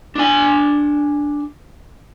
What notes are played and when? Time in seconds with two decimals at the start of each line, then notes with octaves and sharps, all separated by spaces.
0.15 D4 G#5